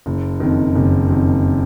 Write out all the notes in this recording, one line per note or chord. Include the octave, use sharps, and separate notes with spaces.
F#1
F2 D#3
F#1
F2 D#3